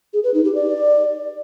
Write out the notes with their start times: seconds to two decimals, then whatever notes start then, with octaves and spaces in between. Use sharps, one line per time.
0.13 G#4
0.24 B4
0.34 D#4
0.44 G4
0.55 D5